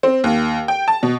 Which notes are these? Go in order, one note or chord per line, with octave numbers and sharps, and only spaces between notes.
C4
D#2
G5
A5
B2